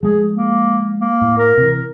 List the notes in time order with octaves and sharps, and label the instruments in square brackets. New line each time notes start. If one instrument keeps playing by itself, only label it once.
[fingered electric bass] F3 G#3 A3 [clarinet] G#4
[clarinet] A#3
A#3
[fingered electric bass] A2
[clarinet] A#4
[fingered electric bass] C3 E3